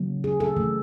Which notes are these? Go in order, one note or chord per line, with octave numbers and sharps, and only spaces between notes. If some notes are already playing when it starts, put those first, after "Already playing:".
Already playing: C#3 F#3 A#3
G#4
A4
E3 A3